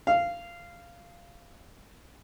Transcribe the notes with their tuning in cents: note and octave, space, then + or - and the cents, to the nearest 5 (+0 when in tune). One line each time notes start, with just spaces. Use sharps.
F5 -15